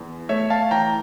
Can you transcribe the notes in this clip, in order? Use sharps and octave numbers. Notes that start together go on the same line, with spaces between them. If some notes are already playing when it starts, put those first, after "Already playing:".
Already playing: E2
A3 C#5 E5
F5 A5
E3 G5 A#5